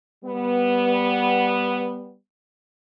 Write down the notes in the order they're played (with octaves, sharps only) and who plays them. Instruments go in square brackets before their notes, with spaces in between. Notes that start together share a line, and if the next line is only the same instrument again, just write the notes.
[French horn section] G3 B3